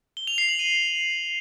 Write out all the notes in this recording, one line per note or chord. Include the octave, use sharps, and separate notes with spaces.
G7
F7
C7
F#7
D#7